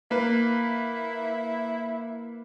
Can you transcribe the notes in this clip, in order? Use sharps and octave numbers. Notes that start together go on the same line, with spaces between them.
A#3 E4 B4